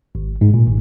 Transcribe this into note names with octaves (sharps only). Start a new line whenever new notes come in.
G#1
G#2
A#2
G#1